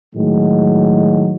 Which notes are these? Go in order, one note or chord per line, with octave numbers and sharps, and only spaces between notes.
A2 D#3 F#3 G#3